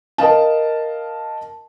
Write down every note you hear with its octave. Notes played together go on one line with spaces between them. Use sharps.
A#4 D#5 F5 A5